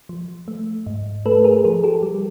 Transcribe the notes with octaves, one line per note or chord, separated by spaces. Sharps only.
F3
A3
G#2
A3 A4 B4
G#4 A#4
F3 G#4 A#4
G4 A4
G3